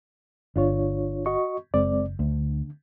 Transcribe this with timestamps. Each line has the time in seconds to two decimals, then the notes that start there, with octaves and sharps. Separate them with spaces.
0.56 G1 D4 F4 C#5
1.26 F#4 D#5 C#6
1.74 F#1 G#3 C4 D5
2.19 D2 D3